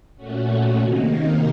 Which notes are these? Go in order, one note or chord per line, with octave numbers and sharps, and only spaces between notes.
A#2 A3 C#4 F#4
C3 D#3 A#3 D#4